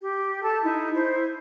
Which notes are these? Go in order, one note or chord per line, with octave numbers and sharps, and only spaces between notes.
G4
A4 A5
D#4 E4
E4 C5